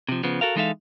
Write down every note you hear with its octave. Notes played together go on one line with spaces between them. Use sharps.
C3 F3
C#3 F3 B3
F#4 A4 A#4 F5
E3 G#3 D#4 A4 E5 F5